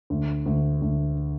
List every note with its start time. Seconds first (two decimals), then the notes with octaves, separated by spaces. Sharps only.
0.10 D2
0.46 D2
0.82 D2